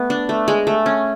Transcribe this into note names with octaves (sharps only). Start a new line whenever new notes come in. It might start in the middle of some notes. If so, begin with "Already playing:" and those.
Already playing: A3 B3
D4
A3
G#3
A3
C#4